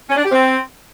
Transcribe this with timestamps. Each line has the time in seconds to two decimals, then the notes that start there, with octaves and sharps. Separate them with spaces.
0.09 C#4
0.17 D4
0.24 G4
0.31 C4